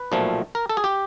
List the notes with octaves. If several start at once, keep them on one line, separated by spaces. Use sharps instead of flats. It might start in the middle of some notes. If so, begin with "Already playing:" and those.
Already playing: B4
B1 A#2 F3 A3
A#4
A4
G#4
G4